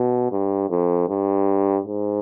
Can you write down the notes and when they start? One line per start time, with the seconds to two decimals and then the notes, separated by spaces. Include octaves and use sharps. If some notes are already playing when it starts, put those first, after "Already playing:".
Already playing: B2
0.32 G2
0.70 F2
1.09 G2
1.87 G#2